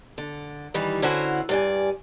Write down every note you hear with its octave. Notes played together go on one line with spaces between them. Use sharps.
D3
D#3 E3 G3
D3 C#4 E4 F#4 C5
G2 D5 G#5